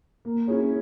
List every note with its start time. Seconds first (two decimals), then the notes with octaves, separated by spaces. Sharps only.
0.25 A#3
0.47 C#4 E4 G#4 C#5